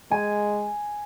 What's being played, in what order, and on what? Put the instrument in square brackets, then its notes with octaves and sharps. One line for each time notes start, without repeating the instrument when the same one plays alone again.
[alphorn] G#3 [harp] G#5